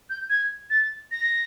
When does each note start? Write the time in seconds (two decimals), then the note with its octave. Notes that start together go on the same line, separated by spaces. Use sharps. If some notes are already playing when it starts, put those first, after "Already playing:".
0.10 G6
0.30 G#6
0.70 A6
1.11 A#6